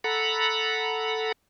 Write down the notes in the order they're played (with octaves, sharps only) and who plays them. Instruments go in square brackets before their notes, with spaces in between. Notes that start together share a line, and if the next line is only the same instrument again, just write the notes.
[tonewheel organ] A4 F#5 A#5 B5